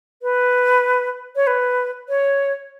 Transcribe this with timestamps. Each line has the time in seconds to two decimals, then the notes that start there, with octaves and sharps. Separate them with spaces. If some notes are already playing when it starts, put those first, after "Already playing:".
0.22 B4
1.36 C#5
1.47 B4
2.09 C#5